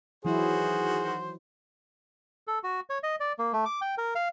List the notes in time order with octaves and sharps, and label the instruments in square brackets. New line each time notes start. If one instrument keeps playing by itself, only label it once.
[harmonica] D#3 F#4 C5 [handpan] E3 F#3 E4 [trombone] G#4
[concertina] A4
F#4
C#5
D#5
D5
A#3
A3
D6
G5
A#4
F5